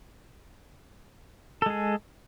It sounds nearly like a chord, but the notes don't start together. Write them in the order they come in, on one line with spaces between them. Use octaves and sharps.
A4 G#3 G#4